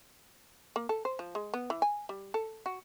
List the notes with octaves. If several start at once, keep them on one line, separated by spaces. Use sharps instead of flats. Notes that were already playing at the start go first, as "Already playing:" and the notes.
A#3
A4
C5
F3
G#3
B3
E3
G#5
G3
A4
F#4